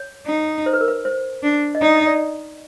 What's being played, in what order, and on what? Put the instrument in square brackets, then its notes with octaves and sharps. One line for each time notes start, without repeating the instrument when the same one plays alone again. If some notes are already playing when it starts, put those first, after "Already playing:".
Already playing: [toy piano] C#5
[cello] D#4
[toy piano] C5
B4
A#4
B4
C5
[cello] D4
[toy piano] D#5
[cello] D#4 [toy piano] D5
[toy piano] D#5
D5